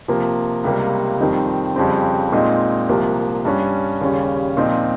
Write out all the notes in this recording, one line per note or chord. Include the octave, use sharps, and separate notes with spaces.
C3 F3 A#3
C#2 C3 G3 A#3
F2 D#3 G3 C4 D#4
F2 C#3 G3 C4
A#2 G#3 C4 D#4
C2 C3 F3 A#3
G2 G3 C#4
D#2 C#3 G3 C#4
A#2 F3 C4 D#4